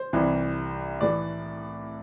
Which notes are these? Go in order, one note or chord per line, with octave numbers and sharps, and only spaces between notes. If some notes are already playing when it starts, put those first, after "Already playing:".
Already playing: C5
C2 C3 E3
A2 E3 A3 D5